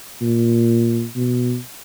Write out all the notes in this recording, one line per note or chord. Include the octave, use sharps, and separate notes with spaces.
A#2
B2